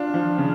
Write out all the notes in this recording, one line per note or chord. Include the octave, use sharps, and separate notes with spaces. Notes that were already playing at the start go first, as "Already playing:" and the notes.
Already playing: D4 F4
F3
C#3